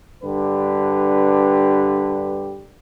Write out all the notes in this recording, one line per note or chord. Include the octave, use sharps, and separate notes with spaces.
G2 D3 G4 B4